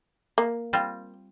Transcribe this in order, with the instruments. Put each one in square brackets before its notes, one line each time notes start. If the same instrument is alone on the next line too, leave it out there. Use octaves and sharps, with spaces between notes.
[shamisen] A#3
[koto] G3 C4 F4